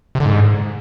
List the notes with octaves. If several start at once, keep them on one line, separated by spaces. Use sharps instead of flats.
C3
D3
G#2